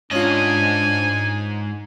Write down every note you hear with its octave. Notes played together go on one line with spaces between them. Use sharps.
G#2 C#4 D4 F4 D#5 G#5